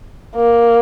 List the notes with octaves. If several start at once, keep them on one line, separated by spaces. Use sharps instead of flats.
A#3